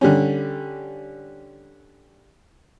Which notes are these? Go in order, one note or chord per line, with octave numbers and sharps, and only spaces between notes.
D3 G3 C#4